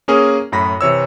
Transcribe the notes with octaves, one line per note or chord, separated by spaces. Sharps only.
A#3 C#4 G#4 A#4
F#2 A2 B5 A#6
C3 E3 C#5 E6